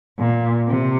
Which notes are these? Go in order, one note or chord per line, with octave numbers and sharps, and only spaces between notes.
A#2
C3